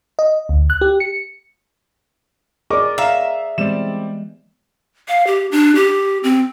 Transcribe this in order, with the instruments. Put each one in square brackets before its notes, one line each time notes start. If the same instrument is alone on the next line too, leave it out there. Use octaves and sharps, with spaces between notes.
[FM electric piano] D#5
D2
F#6
G4
C#7
[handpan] G#4 D5 [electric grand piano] A#4 D#5 C#6 [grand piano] D6
[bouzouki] E5 [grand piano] F5 A#5
[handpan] E3 G#3 B3 [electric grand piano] G3 C4 D5 [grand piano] E7
[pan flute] F5
G4
D4
G4
C4